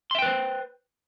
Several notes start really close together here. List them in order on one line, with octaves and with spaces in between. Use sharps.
C6 E5 G5 B4 C5